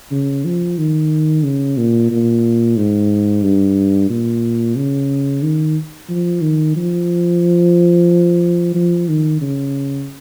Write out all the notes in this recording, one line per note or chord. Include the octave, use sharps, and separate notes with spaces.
C#3
F3
D#3
C#3
A#2
A#2
G#2
G2
A#2
C#3
D#3
F3
D#3
F3
F3
D#3
C#3